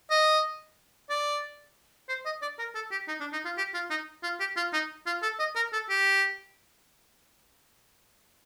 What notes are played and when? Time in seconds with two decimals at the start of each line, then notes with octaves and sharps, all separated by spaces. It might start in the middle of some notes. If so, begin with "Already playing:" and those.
0.10 D#5
1.10 D5
2.09 C5
2.25 D#5
2.42 D5
2.59 A#4
2.75 A4
2.91 G4
3.08 D#4
3.20 D4
3.33 D#4
3.45 F4
3.58 G4
3.74 F4
3.90 D#4
4.23 F4
4.40 G4
4.57 F4
4.73 D#4
5.06 F4
5.23 A4
5.40 D#5
5.56 A#4
5.73 A4
5.89 G4